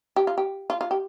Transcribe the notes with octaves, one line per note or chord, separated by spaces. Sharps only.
G4
F4
G4
F4
F4
G4